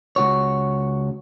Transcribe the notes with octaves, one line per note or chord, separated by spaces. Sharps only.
C#2 F#4 C#5